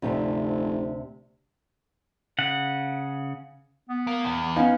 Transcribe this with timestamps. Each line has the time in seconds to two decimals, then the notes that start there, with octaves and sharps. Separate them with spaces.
0.02 F1 D2 C3 C4
2.38 C#3 F#5
3.89 B3
4.07 A#3
4.25 E2
4.56 B3 C#4 D#4 F5